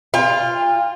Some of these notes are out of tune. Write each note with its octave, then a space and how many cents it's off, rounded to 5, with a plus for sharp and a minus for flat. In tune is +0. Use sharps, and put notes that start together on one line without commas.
F4 +0 G5 +45